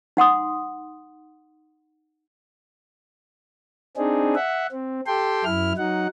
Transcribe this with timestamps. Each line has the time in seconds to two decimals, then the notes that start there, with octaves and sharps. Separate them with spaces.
0.17 D#4 F#5 C6 D#6
3.97 C4 D4 D#4 G#4
4.35 E5 F#5
4.72 C4
5.07 G4 A4 G5 C6
5.45 F#2 E4 F6
5.77 F#3 D#4 F#5